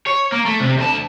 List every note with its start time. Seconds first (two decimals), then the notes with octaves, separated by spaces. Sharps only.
0.07 C#5
0.32 A#3
0.46 A3
0.60 C3
0.78 D2 A5